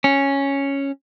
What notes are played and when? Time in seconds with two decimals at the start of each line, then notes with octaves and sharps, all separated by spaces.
0.04 C#4